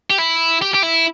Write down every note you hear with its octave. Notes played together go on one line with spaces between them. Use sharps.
G4
E4
G4
G4
E4